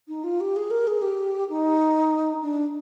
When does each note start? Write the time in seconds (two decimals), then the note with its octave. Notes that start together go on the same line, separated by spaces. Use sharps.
0.08 D#4
0.24 F4
0.41 G4
0.56 G#4
0.71 A#4
0.87 G#4
1.02 G4
1.50 D#4
2.43 D4